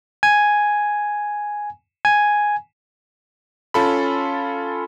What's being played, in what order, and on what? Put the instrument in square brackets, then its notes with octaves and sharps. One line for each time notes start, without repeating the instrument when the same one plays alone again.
[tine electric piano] G#5
G#5
[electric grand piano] C#4 F4 A4 B5